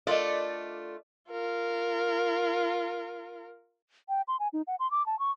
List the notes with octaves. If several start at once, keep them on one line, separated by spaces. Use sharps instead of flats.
A3 D4 F4 A#4 D5 D#5
F4 A#4
G5
C6
G#5
D#4
F#5
C6
D6
A5
C#6